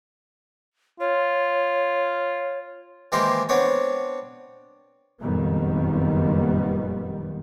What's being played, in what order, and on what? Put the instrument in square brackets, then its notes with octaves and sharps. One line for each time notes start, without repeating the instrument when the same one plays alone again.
[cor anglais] F4 [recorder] C#5
[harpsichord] D#3 E3 G#3 A#3 G4 C5
B3 C4 D4 C#5
[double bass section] F#1 F2 A#2 D#3 G3 B3